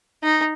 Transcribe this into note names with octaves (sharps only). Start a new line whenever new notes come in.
D#4